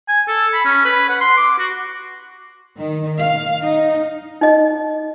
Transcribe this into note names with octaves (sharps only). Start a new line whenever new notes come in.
G#5
A4
B5
C#4
B4
F#5
C6
D6
F#4
D#3
F5
D#4
D#4 D#5